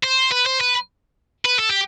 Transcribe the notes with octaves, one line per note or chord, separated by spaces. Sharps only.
C5
B4
C5
B4
B4
A4
G4